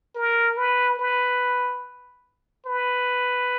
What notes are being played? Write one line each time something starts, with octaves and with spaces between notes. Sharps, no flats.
A#4
B4
B4
B4